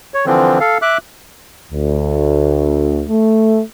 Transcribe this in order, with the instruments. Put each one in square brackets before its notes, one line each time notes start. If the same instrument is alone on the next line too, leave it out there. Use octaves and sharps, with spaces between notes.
[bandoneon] C#5
D3 E3 F3 C4
A4 F5
E5 D6 F#6
[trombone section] D2
A3